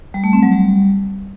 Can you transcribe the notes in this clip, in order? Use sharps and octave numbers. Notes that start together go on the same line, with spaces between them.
G3
A3
C4
F#3
G3